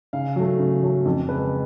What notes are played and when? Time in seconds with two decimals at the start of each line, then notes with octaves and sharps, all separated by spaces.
0.13 C#3 F5
0.36 F#3 A3
0.59 C#3
0.83 F#3 A3
1.05 F2
1.28 C#3 G#3 B4